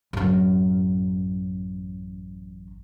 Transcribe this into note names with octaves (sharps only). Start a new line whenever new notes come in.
A1 F#2